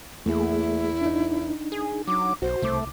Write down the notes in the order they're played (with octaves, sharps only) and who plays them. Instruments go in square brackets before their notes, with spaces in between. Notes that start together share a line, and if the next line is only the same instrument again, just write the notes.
[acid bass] E2 [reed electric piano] A3 A#3 G#4 [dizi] E4
[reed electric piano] D4 D#4
[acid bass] G#4
[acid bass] F#3 [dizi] D6
[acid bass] B1 [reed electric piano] F#4 [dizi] C5
[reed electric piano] C2 D6 [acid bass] A3